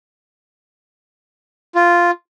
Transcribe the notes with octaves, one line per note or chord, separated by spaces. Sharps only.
F4